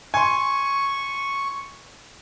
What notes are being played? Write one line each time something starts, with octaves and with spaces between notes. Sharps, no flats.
G#5 C6 C#6